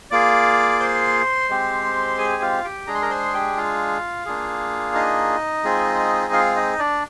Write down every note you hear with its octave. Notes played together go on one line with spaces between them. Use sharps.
A#3 F4 G#4 D5 D6
C5 C6
G#3 C4 G4
G#4 G#5
F4 F5
G4 G5
G#3 D4 G#4 A#5
C6
A#4 A#5
C5 C6
G4 G5
F4 F5
A#3 D4 F4 G#4
D#4 D#5
G#3 C4 F4 G#4
F4 F5
D#4 D#5
D4 D5